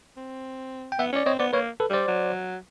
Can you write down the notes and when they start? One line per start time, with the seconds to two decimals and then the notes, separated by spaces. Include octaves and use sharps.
0.17 C4
0.92 G5
0.99 B3 E5 F#5
1.13 C#4 D5
1.26 C4 C#5 D#5
1.39 B3 C5 D5
1.53 A#3 B4 C#5
1.80 A4 B4
1.90 G3 C5 D5
2.08 F#3